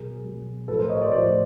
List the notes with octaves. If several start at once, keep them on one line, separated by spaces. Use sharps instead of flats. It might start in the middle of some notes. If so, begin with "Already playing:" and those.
Already playing: B2 F#3 G#4 A#4
B2 F#3
A2 F3 A4 B4
A#4 C5
C#5 D#5
C5 D5
A2 F3 C5 D5